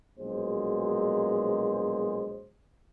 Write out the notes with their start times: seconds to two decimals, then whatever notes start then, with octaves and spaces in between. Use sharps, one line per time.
0.19 A#1 B2 F#3 G#3 C5